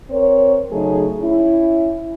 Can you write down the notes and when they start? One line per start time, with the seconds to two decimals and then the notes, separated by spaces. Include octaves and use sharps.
0.10 C4 A#4 C#5
0.71 C#3 F#3 A3 D#4 G#4
1.21 C#4 E4